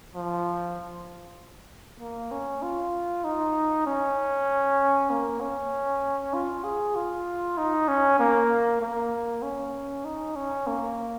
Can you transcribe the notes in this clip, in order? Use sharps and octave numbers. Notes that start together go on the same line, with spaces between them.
F3
A#3
C#4
F4
D#4
C#4
A#3
C#4
F4
G#4
F4
D#4
C#4
A#3
A#3
C#4
D#4
C#4
A#3